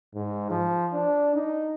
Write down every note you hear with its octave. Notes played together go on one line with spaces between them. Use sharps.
G#2
F3
D4
D#4